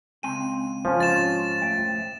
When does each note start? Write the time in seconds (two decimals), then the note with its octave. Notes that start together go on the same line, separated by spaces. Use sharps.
0.23 C#2 C4 G5 D#7
0.85 F3 C#4
1.00 G#2 F4 C6 A6 E7
1.62 A3 E5 G5